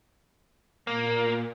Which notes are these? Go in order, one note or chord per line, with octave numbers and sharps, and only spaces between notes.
A#2 A#3